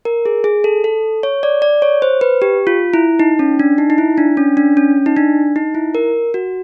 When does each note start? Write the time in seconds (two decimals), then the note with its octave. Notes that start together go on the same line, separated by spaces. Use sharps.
0.05 A#4
0.26 G#4
0.44 G#4
0.64 A4
0.84 A4
1.23 C#5
1.43 D5
1.62 D5
1.82 C#5
2.02 C5
2.21 B4
2.42 G4
2.67 F4
2.94 E4
3.19 D#4
3.39 C#4
3.59 D4
3.78 D#4
3.90 D#4
3.98 E4
4.18 D4
4.37 C#4
4.57 D4
4.77 C#4
5.06 D#4
5.16 D4
5.56 D#4
5.75 E4
5.95 A#4
6.34 F#4